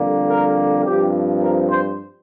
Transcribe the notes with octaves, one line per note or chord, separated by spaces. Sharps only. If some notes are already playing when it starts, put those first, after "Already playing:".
Already playing: F2 D3 G3 A#3
A#4
G2 F3 C4 G4
A#4
C5